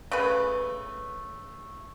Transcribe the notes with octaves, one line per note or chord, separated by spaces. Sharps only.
C#3 A3 B4